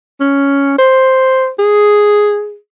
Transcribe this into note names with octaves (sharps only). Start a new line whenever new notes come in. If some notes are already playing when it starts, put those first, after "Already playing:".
C#4
C5
G#4